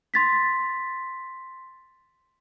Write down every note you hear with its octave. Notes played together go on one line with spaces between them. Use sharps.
C6 A6 B6